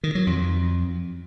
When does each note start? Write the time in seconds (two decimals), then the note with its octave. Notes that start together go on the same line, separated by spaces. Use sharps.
0.04 D#3
0.15 F#3
0.27 F2